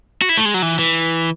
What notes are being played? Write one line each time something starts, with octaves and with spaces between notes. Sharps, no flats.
F#4
E4
A3
G#3
F#3
E3
E3